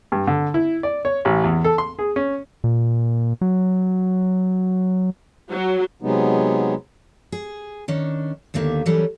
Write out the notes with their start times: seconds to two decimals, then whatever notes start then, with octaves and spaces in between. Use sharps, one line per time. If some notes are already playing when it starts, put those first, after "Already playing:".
0.12 G2
0.27 D3
0.54 E4
0.83 D5
1.05 C#5
1.25 A1
1.44 E2
1.64 A4
1.78 C6
1.99 G#4
2.16 C#4
2.64 A#2
3.41 F#3
5.52 F#3
6.02 C3 F#3 G#3 B3 D#4
7.32 G#4
7.88 D#3 C#4 D4
8.54 D#2 D3 D#3 A#3 E5
8.86 E3 F#3 G3 C#4 A4 A#4